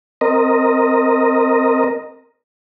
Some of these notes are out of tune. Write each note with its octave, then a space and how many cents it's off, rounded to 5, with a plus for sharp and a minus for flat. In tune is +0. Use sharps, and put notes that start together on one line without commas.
C4 +0 A#4 -10 D#5 +0